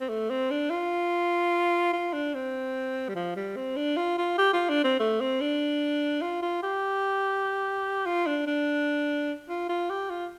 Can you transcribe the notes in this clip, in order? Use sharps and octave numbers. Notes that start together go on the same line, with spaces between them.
C4
A3
C4
D4
F4
F4
D4
C4
G3
F3
G3
C4
D4
F4
F4
G4
F4
D4
C4
A3
C4
D4
F4
F4
G4
F4
D4
D4
F4
F4
G4
F4